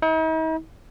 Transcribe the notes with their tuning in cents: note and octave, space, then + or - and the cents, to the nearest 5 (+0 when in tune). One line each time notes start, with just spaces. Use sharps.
D#4 +45